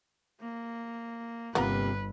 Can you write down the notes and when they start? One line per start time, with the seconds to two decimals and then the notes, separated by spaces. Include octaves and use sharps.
0.41 A#3
1.55 G1 C3 A#3 B3 F4 B4 A#5